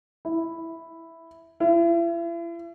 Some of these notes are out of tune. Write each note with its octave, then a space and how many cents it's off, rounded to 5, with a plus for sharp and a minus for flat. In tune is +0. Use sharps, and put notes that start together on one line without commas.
E4 +0
E4 +40